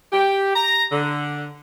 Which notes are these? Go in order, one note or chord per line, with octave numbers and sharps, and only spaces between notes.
G4 G5
A#5
D3